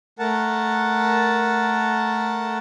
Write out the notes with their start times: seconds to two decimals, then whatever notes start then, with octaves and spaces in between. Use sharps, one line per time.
0.19 A3 A#4 F#5 A5